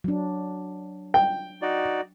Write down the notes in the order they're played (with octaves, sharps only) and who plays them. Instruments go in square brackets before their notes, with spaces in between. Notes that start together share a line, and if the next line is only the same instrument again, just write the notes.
[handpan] F#3 D4
[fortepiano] G5
[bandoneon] D#4 F#4 D5